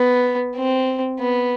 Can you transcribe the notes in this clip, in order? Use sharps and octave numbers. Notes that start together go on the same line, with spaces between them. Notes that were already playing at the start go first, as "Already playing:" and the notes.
Already playing: B3
C4
B3